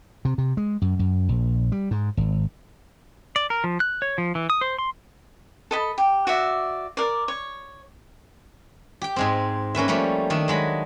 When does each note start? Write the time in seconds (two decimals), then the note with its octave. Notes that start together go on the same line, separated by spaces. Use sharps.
0.25 C3
0.38 C3
0.57 G#3
0.82 F#2
0.99 F#2
1.29 A#1
1.72 G3
1.91 G#2
2.17 G#1
3.36 D5
3.50 A#4
3.64 F3
3.80 F#6
4.02 C#5
4.18 F3
4.35 E3
4.50 D#6
4.61 C5
4.79 C6
5.71 A4 D#5 B5
5.98 G4
6.27 F#4 D5 E5
6.97 A#4 D5
7.28 C#5
9.02 G4 G5
9.16 G#2 G#3 C4
9.75 A#3 C#4 B4 E5
9.88 F3 G3 A3 A#3 C#4
10.30 D#3 A3 D4
10.48 F#3 G#3 B5